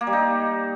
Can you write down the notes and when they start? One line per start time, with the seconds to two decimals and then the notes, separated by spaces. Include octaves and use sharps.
0.01 A#3
0.07 G3
0.13 D#4